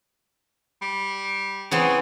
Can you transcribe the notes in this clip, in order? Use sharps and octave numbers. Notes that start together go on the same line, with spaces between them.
G3
C#3 E3 B3 C4